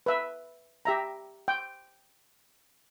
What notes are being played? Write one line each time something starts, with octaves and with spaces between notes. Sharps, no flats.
B4 E5
G4 E5 A#5
G5